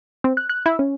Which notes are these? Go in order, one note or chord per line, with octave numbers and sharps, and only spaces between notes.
C4
F#6
F#6
E4
C#4